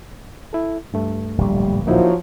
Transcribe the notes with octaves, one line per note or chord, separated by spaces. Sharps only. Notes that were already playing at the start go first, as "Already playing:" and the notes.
E4 A4
C#2 G2 A3
D1 A#1 G3
F3 F#3 A#3 D#4 E4